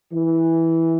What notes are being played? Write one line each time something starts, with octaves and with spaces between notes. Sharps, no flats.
E3